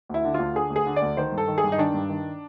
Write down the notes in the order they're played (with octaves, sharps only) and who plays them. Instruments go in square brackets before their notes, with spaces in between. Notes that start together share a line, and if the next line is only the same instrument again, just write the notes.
[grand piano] D2 E4
D3
D2 F4
D3 G#4
D2
G#4
D3
D5
D2
D#3 C5
G2
A4
D#3
G#4
G2
D#4
D#3 D4
G2
D#3